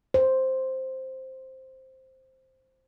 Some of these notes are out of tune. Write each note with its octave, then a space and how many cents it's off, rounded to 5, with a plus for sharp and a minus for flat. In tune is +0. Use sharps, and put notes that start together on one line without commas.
C5 +5